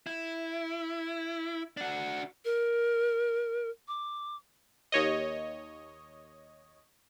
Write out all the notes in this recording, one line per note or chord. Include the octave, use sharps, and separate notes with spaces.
E4
D4 F#4
A#4
D6
D#2 C#5 D#5